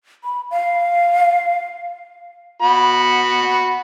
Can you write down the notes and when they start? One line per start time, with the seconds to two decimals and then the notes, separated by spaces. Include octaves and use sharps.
0.24 B5
0.51 F5
2.62 F#4 B5